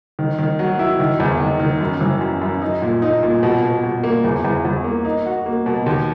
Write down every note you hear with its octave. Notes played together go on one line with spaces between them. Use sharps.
D#3
D#3
F#3
E4
D#3
E2
D#3
D#3
F#2
E3
F#2
F#2
D#4
A#2
D#4
A#2
B2
B2
B2
A#3
E2
E2
E2
A#3
D#4
F#4
A#3
B2
D#2